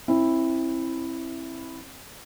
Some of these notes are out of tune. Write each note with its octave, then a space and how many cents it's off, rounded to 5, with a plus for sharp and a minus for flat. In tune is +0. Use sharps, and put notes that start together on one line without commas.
C4 +35 E4 +0